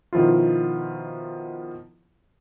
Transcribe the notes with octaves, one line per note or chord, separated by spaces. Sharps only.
B2 D#3 F3 E4 F4